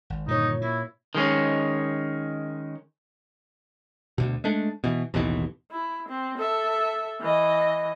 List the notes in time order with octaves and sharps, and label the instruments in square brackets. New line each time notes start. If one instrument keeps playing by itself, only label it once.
[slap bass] G#1
[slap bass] G2 D3 D#3 [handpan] A#2 C#5 [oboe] D#4
[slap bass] A#3 [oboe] E4
[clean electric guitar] D#3 G#3 C#4
[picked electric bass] D2 B2
G#3 A3 D4
B2 E3
A1 D#2 B2 E3
[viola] E4
C4
A4 E5
E3 D#5